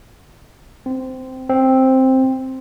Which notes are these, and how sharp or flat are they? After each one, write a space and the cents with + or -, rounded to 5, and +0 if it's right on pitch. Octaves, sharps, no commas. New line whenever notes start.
C4 -15
C4 +5